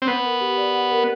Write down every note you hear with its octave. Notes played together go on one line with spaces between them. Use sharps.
C4
B3 F#5
A#4
G4
D5
F#5
A#4